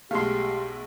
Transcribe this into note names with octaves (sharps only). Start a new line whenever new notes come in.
B1 G#3 A3 G4 F5 C6